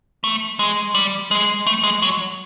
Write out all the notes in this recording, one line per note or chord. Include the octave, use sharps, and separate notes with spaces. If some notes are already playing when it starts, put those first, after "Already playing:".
A3
G#3
G3
G#3
A3
G#3
F#3